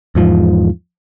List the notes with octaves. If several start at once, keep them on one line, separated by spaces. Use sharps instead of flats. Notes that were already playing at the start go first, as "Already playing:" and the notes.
E2 G#2 F3